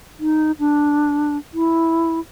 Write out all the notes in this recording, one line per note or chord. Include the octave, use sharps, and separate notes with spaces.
D#4
D4
E4